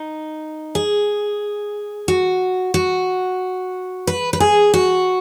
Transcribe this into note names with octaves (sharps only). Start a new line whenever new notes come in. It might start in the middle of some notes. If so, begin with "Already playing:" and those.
Already playing: D#4
G#4
F#4
F#4
B4
B4
G#4
F#4